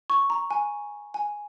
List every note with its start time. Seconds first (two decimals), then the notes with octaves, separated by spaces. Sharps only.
0.10 C#6
0.30 A#5
0.50 G#5
1.14 G#5